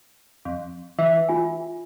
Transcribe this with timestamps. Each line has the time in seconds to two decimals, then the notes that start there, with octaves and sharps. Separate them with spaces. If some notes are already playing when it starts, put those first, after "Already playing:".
0.45 F2
0.99 E3 E5
1.29 F4 G#5